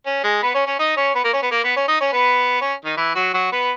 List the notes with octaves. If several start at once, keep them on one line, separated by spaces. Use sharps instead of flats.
C#4
G#3 G#4
B3 B4
C#4 C#5
C#4 C#5
D#4 D#5
C#4 C#5
B3 B4
A#3 A#4
C#4 C#5
B3 B4
A#3 A#4
B3 B4
C#4 C#5
D#4 D#5
C#4 C#5
B3 B4
C#4 C#5
D#3 D#4
E3 E4
F#3 F#4
F#3 F#4
B3 B4